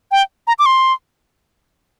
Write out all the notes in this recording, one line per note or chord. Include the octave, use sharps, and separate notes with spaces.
G5
A#5
D6
C6